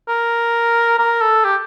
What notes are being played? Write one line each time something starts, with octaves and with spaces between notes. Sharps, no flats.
A#4
A#4
A4
G4